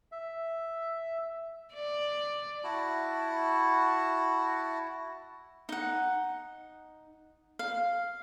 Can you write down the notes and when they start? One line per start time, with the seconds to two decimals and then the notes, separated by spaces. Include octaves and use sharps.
0.12 E5
1.74 D5
2.64 E4 F#4 A5
5.69 D#4 F#5
7.59 F5